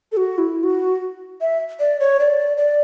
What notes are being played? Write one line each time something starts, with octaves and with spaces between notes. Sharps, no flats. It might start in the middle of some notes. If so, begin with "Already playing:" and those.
A4
F#4
E4
F#4
E5
D5
C#5
D5
D5